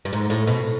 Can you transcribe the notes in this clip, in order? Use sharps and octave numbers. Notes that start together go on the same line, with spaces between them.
G2
G#2
A2
B2